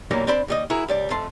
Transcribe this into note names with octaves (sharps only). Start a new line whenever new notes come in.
B1 F#2 E3 F#3 G3 A#3
C4 D4 C5 D5 B5
D#2 G3 D#5
E4 F#4 G#4 A#4
C#2 G3 D5
F2 A3 A5 C6